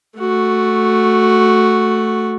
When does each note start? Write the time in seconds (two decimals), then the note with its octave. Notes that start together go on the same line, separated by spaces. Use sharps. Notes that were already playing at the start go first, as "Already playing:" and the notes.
0.18 A3 F#4